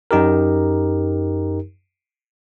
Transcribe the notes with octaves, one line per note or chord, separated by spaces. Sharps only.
F#2 D#4 G4 A#4